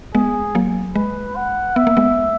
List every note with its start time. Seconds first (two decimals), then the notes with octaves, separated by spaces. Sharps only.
0.14 G#3 B3 G#4
0.55 F#3 A#3
0.96 G#3 B4
1.36 F#5
1.76 B3 E5
1.87 A#3
1.97 G#3 B3